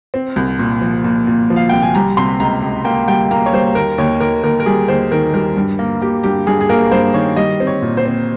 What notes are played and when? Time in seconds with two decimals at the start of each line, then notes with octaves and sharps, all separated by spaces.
0.14 C4
0.36 C2
0.59 A#2
0.81 F3
1.04 A#2
1.27 A#2
1.50 F3
1.56 F5
1.69 C2 G5
1.82 G#5
1.95 G3 A#5
2.17 C3 C6
2.40 C#2 A#5
2.62 C#2
2.85 A#3 G5
3.08 G3 G5
3.31 A#3 A#5
3.46 C#5
3.52 G3 C5
3.75 D#2 A#4
3.98 D#2 C#5
4.20 D#2 A#4
4.44 D#2 A#4
4.60 A#4
4.66 G3 G#4
4.88 D#2 C5
5.12 D#3 A#4
5.33 G3 A#4
5.57 G2
5.79 A#3
6.02 A#3 G4
6.23 G2 G4
6.47 G2 G#4
6.61 G#4
6.69 A#3 A#4
6.91 G2 C5
7.14 D#3 C#5
7.36 G3 D#5
7.60 C4
7.67 C#5
7.82 A#2
7.97 C5
8.05 C4